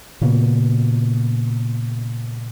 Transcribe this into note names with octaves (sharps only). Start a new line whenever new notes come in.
A#2 C#3 A#3 B3